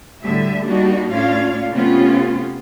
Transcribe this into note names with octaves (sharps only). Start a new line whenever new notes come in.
D2 A2 D3 G3 E5
G3 A#3 D4 D#4 F#4
A2 C#4 D4 F4 F5
C3 A3 B3 C#4 F4